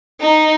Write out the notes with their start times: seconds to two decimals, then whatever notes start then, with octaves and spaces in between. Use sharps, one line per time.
0.21 D#4